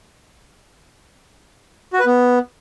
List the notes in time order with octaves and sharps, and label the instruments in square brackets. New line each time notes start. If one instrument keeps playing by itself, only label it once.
[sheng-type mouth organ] F#4
B4
B3